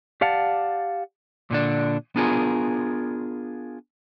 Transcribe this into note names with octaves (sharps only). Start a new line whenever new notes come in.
G4 D5 F5 F#5 A5
A#2 D3 D4
B3 D4 F4 G#4 A#4